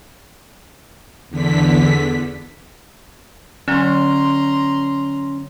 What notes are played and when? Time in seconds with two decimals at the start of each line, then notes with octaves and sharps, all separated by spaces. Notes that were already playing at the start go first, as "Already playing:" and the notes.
1.30 E2 D3 B6
3.68 D3 F#3 C#4 A#5 C6